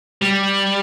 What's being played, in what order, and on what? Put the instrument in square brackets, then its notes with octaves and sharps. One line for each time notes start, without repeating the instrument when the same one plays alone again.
[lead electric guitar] G3